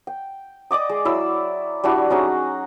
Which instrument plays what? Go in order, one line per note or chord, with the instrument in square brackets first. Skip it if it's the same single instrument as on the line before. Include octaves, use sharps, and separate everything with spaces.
[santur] G5
D5 D#5 D6 D#6
G#3
F#3 E4 E6
G3 D4 E4 F#4
F#3 C#4 D#4 G#4